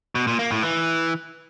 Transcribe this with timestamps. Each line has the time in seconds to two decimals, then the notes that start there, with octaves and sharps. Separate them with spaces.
0.15 B2
0.27 A#2
0.39 A#3
0.51 A2
0.63 E3